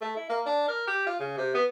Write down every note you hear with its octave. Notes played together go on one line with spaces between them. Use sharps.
A3
E4
A#3
D4
A#4
G4
F4
C#3
C3
B3